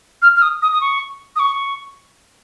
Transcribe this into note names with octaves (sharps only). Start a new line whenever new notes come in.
F6
F6
D#6
D#6
D#6
C#6
D#6
C#6